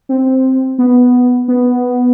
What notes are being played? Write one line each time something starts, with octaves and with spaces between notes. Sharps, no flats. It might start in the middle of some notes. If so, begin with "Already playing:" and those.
C4
B3
B3